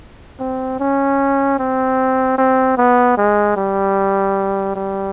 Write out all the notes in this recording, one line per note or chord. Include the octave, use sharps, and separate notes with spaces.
C4
C#4
C4
C4
B3
G#3
G3
G3